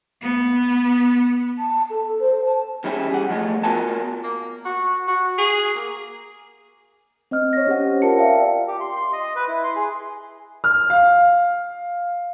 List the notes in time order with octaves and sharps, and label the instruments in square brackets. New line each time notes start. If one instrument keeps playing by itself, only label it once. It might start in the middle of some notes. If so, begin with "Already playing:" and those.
[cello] B3
[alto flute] A5
A4
C5
A5
[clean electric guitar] E2 G3 C#4 E4 G4 G#4
G#4 F#5
F3 G#3 A3 B3
B3 F4 F#4 A#4 G#5 A5
[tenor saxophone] A#3
F#4
F#4
G#4
A#3
[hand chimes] C4 D#5 F6
C#5 A#6
C#4 G4 C5 F#5
F4 A#4 A5 C#7
D5 E5 F5 G5 A5
[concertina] G4
C6
C6
D#5
B4
E4
C6
G#4
[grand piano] F6
F5